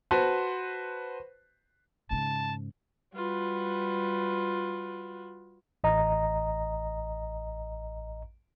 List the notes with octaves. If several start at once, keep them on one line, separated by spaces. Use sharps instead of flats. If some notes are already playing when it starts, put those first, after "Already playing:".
F#4 B4 C5 A5
G#2 C#3 A5
G3 F4 F#4 B4
A1 D#5 A#5